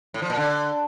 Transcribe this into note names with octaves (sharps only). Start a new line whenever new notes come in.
A2
F3
A#2
D3